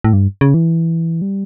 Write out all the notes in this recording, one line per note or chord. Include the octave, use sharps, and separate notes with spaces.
A2
G2
C#3
E3
G3